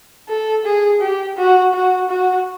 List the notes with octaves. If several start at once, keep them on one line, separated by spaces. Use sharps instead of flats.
A4
G#4
G4
F#4
F#4
F#4